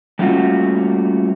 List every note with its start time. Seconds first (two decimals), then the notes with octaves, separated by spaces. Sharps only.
0.19 G3 A3 A#3 C#4 F4 F#4